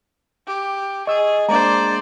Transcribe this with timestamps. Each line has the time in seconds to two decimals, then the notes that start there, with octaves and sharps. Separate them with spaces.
0.47 G4
1.07 G#4 D#5 C#6 E6
1.49 G#3 A#3 D4 C5 D5 A#5